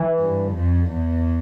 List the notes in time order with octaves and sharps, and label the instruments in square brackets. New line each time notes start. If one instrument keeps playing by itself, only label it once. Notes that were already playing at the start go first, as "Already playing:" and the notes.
Already playing: [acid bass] E3
[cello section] G2
F2
E2